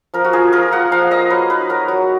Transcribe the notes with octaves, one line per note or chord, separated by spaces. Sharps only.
F3 A#4
F#4
F3 G#4
F4 A#4
A#3 F#5
F3 F5
A#3 D#5
F#3 B4
D#4 B4
F#3 A#4
F#3 F#4